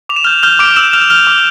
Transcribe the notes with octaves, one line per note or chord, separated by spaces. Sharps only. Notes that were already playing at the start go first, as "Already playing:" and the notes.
D6 F7
E7
F6 G6 F7
F6 G6 F7
D6 D7
D6 E6 E7
F6 G6 F7
F6 G6 F7
D6